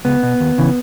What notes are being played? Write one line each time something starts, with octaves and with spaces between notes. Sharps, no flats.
C#2 B3
B2
D#2
C#3 E3